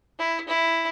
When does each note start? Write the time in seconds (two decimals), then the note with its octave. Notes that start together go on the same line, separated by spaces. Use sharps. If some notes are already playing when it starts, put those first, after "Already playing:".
0.19 E4
0.48 E4